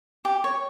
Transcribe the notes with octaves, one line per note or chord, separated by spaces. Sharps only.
G4
C#5